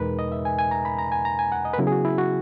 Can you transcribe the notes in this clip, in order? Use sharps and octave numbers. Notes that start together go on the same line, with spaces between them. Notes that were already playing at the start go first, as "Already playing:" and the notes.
Already playing: E2 B2 G#3 D#4 A#4 B4
D#5
E5
G#5
G#5
A#5
B5
A#5
G#5
A#5
G#5
F#5
D#5
B4
C#3 F#3 B3 E4 A#4
G#4
F#4
E4
F#4